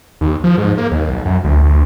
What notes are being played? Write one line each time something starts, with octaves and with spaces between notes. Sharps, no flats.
D#2
F3
G#2
A#3
D#2
B1
F#2
D2
D2